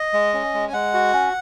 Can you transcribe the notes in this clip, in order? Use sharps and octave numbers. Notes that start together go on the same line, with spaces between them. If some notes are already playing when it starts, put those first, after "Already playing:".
Already playing: D#5
G#3
C#4
G#3
G#5
G#3 F#5
F#4
C#4